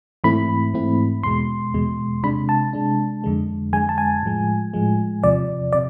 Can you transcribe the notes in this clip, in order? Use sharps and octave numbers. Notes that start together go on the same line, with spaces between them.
G#2 E3 A3 C4 E4 B5
G#2 E3 A3 C4 E4
E2 B2 G#3 C6
E2 B2 G#3
C3 G#3 D4 B5
A5
C3 G#3 D4
F2 D3 G#3
F2 D3 G#3 G#5
A5
G#5
A2 F3 G#3
A2 F3 G#3
E2 C3 F3 D5
C3 D5